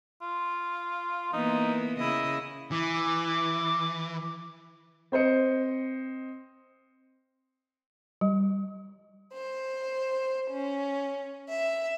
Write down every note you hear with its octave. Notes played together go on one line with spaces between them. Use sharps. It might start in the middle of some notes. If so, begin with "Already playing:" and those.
F4
E3 A#3 B3 D#4
C#3 E4 D#5
E3 D6
C4 C5 D#5 C#7
G3
C5
C#4
E5